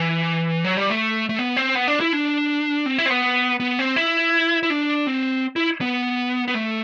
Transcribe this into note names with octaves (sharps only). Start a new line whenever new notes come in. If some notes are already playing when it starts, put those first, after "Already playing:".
Already playing: E3
F#3
G3
A3
A3
B3
C4
B3
D4
E4
D4
C4
E4
C4
B3
B3
C4
E4
E4
D4
C4
E4
B3
B3
A3